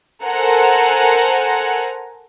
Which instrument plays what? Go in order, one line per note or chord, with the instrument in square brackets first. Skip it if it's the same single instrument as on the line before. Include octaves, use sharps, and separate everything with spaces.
[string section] A4 A#4 C5 F#5 G#5 A#5